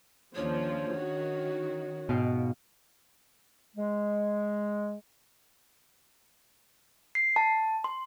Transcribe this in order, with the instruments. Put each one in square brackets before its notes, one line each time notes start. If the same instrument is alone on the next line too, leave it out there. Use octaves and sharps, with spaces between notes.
[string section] D#2 F3 [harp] C#4 D4 G#4 [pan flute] C#5
[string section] D#3 F#4
[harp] G#2 F5 G5 [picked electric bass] B2
[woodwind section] G#3
[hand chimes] C7
A5
C6